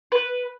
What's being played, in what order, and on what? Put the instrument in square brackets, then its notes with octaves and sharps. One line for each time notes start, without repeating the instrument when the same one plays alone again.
[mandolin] B4